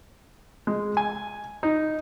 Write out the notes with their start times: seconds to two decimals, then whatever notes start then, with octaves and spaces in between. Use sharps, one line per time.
0.67 G#3
0.97 G#5
1.63 D#4